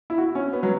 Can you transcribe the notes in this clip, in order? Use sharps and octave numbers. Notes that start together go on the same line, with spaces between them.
E4
F#4
C#4
B3
F#3